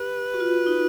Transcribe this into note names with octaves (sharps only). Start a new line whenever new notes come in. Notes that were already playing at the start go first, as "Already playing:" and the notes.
Already playing: G4 B4
F#4
F4
D#4